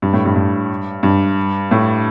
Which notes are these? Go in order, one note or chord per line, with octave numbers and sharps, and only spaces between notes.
G2
A2
G2
G2
G2
A2